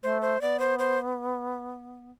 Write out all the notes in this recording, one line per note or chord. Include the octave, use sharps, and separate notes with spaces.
A3 C5
C5
B3 D5
C5
C5